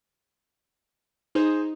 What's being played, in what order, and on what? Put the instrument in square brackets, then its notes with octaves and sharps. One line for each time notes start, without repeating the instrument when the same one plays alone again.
[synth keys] D#4 [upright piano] G#4 C5